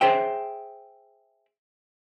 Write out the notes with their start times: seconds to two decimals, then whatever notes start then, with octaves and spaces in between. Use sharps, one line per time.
0.01 G#4 C5 E5 G5